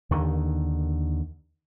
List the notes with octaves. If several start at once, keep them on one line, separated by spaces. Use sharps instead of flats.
D#2 D3 D#3